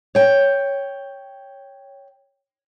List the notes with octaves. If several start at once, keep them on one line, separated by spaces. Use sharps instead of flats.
C#5 G5